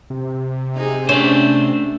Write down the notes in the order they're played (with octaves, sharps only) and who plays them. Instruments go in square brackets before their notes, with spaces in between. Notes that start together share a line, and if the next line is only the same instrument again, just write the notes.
[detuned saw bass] C3
[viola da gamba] D#4 G#4
[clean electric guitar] A3 C5 [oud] C#4 [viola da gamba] D4